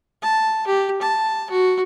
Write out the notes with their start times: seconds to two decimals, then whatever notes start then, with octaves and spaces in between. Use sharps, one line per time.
0.22 A5
0.67 G4
1.01 A5
1.50 F#4